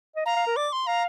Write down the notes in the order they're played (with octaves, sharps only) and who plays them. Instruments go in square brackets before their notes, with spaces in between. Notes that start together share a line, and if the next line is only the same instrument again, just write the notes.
[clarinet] D#5
[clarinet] F5 [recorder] A#5
[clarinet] F5
A#4
[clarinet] D5 [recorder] D6
[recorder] C6
[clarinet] F5 [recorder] A#5